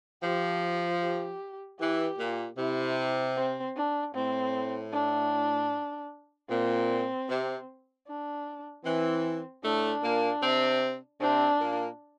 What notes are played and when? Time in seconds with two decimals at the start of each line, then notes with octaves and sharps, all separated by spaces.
0.23 F3 G4
1.01 G4
1.79 E3 G4
2.19 A#2
2.58 C3 E4
3.36 C4
3.76 D4
4.15 A2 C4
4.93 D4
6.50 A#2 C4
7.29 C3
8.07 D4
8.85 E3 C4
9.63 A2 A3 D4
10.02 A#2 A#3
10.42 C3 C4
11.20 C3 C4 D4
11.60 A#2 A#3